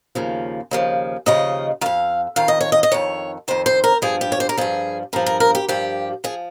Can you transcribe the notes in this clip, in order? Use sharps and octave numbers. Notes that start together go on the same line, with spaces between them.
D#2 C#3 F3
D#2 C#3 F3
D#2 C#3 F3 D#5
F2 D#3 F5
F2 D#3 F5
D#5
C#5
D#5
D#5
F2 D#3 C#5
F2 D#3 C5
C5
A#4
G2 F3 G#4
G4
C#5
C5
A#4
G2 F3 G#4
G2 F3 A#4
A#4
A#4
G4
G2 F3 G4
F3 G#4